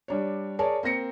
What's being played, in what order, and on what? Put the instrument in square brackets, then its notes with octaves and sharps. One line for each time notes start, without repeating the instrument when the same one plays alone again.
[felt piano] G3 D4 C#5
G#4 A#4 C#5 D5 A5
A#3 C4 A#6 C#7